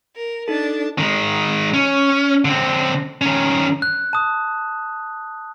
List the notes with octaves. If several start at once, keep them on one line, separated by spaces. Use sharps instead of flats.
A#4
D4 D#4 A4 A5
D#3 G#3
C#4
D3 C4
D#3 C#4
F#6
A5 D#6